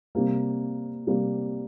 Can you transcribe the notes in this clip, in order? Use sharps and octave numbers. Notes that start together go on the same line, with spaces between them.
C3 G3 A#3
C3 G3 A#3